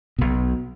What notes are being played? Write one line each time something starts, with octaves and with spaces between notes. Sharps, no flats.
B1 B2